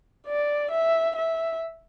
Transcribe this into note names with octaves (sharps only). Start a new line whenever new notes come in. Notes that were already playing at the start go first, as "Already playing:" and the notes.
D5
E5
E5